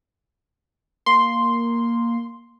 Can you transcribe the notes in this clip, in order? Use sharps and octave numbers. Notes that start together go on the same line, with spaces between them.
A#3 C6